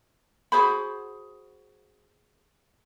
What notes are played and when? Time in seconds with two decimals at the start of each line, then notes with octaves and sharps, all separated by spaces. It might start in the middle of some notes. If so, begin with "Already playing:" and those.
0.52 F#4 G#4 C5 B5